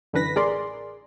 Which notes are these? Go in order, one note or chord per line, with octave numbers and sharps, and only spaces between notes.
F#2 D3 E3 B4 A#6 B6
A1 G#4 A#4 D5 C6